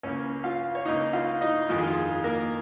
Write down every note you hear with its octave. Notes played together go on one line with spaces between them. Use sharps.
C#2 C#3 A#3 C#4 C#5
F4 F5
C#5
C#2 C#3 A#3 D#4 D#5
F4 F5
D#4 D#5
F2 D#3 G#3 F4
G#4
F4
G#4
A#3 A#4